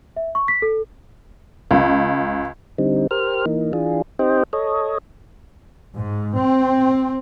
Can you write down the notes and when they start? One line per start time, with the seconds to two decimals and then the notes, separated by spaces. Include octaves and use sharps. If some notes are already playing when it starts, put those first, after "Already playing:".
0.17 E5
0.35 C#6
0.48 B6
0.62 A4
1.71 C#2
2.78 D3 G3 C4 D#4
3.11 G4 A#4 C5 F6
3.46 E3 A#3 D#4
3.73 E3 D4 F4 G#4
4.19 C4 D#4 G4 C5 D#5 G5
4.53 A4 C#5 D#5
5.97 G#2
6.38 C4